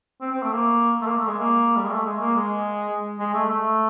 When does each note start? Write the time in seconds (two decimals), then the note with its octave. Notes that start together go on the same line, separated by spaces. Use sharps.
0.21 C4
0.32 C4
0.43 A3
0.53 A#3
1.01 A3
1.06 A#3
1.18 A3
1.28 G#3
1.39 A#3
1.76 G3
1.84 G#3
1.92 A3
2.06 G#3
2.21 A#3
2.35 G#3
3.20 G#3
3.34 A3
3.49 A3